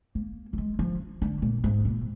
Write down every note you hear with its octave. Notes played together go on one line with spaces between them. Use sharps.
A#3
A#3
G#3
F3
D3
A#2
G#2
A#2